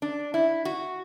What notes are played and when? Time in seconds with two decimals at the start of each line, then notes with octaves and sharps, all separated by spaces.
0.02 D4
0.34 E4
0.65 F#4